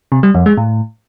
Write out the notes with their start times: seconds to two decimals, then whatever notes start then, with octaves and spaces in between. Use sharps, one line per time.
0.12 C3
0.23 G3
0.35 F2
0.46 G#3
0.57 A2